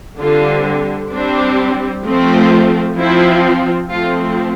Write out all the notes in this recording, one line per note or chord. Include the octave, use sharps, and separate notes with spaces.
D3 G3 C4 F4
G3 C4 D4
F3 A3 C4
F3 C4 E4
F3 A3 C4 F4